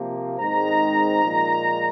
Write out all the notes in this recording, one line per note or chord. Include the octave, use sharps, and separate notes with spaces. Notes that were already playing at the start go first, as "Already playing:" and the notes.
Already playing: C3 F3 A#3
G#2 D#3 G#3 C4 D#4 A#5
A#2 F3 G#3